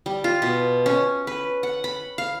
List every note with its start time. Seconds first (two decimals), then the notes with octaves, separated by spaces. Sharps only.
0.06 G3
0.24 F4
0.42 B2
0.86 C#4
1.27 B4
1.63 F#5
1.84 B5
2.18 F5